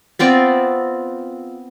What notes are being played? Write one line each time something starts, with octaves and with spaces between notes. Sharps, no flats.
B3 C4 F4 D5